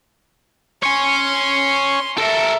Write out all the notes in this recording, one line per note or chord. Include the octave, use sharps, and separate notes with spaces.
C#5 G#5 C6
A4 A#4 E5